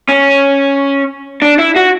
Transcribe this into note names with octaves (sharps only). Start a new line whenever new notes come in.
C#4
D4
E4
F#4